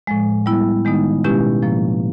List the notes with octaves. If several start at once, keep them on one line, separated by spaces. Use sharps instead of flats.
A2 F3 G#3
G3 B3 E4
D#3 G#3 B3 D#4
B2 G#3 C#4 E4 G4
A2 F3 A#3